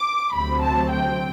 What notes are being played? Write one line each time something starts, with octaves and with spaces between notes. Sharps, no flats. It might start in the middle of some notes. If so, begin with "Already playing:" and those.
Already playing: D6
D2 C3 F#3 C4 B5
A5
G5